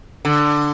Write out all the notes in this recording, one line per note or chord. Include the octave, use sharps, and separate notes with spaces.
D3